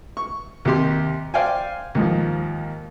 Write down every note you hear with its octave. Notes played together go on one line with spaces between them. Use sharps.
C#6
D#2 C3 G4 C6
C5 D5 F5 G5 G#5
D#2 G#2 F3